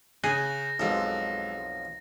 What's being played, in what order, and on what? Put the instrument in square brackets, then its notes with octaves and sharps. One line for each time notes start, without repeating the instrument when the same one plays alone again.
[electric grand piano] C#3 G#5 F#6 [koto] G#4 [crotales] A#6
[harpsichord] B1 F2 [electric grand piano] G#3 A4